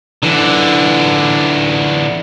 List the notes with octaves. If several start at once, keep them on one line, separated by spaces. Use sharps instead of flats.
D3 E3